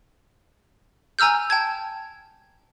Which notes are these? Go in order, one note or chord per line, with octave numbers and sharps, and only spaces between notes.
G#5 A#5 E6 F6 G6
G5 A5 G#6